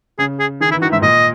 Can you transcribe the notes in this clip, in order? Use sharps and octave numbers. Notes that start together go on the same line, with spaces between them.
C#3 G#4
G#4
D#3 G#4
E3 E4
D#3 F#4
G#2 E5
A#2 D#5